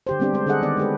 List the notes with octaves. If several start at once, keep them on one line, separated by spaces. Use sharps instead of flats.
D3 G4 C5
G3 B3 C4 D4 G4
G#3 C5
D3 D4 G#4 A4 D#5 F#5
D#3 B3 D5
G#3 G4 B4